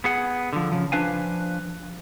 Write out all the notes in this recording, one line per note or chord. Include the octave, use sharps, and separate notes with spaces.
B3 G#4 F#5
D3 F3
C#3 F3
F3 D4 B4 F5 G#5